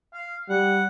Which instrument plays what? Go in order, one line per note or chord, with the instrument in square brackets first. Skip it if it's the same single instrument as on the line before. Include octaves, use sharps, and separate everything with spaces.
[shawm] F5
[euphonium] G3 [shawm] F#5